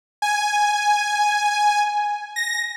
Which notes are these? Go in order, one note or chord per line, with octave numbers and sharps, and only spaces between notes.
G#5
A#6